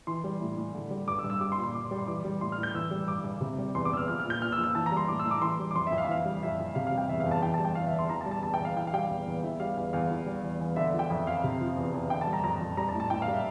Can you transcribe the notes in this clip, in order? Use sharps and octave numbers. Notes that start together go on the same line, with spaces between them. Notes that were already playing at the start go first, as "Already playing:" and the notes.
E3 C6
G3
A2
A2
D3
G3
G2 D6
E6
G2
E6
G3 D6
C6
A#2
C6
A#2 D6
G3
C6
E3 D6
G3
A2 C6
F6
A2
G6
E3 E6
G3
G2 D6
G2
C3
G3
E2 C6
D6
E2 E6
F6
F3 F6
F6
A#2 G6
A#2 F6
E6
F3
E6
E3 A5
A#5
G3
C6
A2 D6
E6
A2
D6
E3 C6
G3
D6
F2 C6
E5
F2
F5
E5
E3 F5
G3
F2 E5
F2
C3 F5
F5
G3
G5
E2 E5
F5
E2
A5
E3 G5
A5
G3
G5
E2 F5
E5
E2
C6
E3 A#5
A5
G3
A5
E2 A5
G5
E2
F5
E3 G5
F5
G3 G5
F5
E2
E2
E3 E5
G3 F5
E2 F5
E2 F5
E3
G3
E2
E2
D3 E5
F3
G5
F2 E5
F2 F5
C3
F3
E2
E2
D3 G5
A5
G3
A#5
F2 A#5
F2
G3 A#5
A5
A2
A5
A2 G5
F5
G3
E5